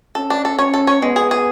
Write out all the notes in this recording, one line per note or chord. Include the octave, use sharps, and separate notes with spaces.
C#4 A4
D4
A4
C#4 C#5
A4
C#5
G#3 B3
G#4
G#4